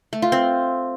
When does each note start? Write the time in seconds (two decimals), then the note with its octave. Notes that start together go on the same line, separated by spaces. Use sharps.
0.13 A3
0.22 F4
0.32 C4